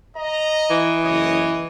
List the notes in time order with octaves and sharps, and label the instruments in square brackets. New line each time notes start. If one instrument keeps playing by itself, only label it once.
[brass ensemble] D#5 A#5
[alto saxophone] E3
[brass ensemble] F#1 C#5 D#5